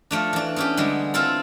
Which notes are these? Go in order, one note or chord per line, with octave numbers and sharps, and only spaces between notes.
F3 A3 D4
E3 D4
B3 C#4 G4
D3 G3 G#3
C4 E4 F4 A4